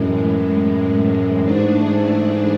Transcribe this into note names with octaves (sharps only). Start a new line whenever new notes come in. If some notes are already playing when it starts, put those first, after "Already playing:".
Already playing: F#2 A2 E3 G#3
G#2 E3 A3 D4 G#4
G#2